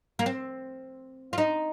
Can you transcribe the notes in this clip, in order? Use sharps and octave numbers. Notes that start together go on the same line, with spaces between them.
A#3
C4
F4
D#4